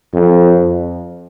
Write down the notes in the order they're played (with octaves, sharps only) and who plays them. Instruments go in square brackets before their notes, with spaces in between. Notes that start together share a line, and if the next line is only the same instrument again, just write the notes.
[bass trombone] F2